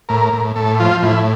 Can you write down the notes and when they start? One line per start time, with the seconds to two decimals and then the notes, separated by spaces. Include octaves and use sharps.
0.09 A2 A#4
0.33 A2
0.55 A2 A4
0.80 F3 F4
1.03 A2 E4